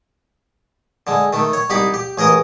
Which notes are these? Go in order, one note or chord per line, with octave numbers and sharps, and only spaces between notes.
D3 G#3
D#3 A3
C#5
C2 D#4 G4 B5 D6
G4
A1 G#4 A#4 D#5 D#6